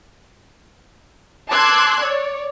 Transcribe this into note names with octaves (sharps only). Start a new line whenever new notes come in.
A5 C6 D6 E6 F#6 G#6
C#5 D5